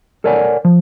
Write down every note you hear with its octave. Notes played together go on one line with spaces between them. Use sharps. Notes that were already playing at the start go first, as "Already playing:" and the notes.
A4 A#4 C#5 D5 F#5 G#5
F3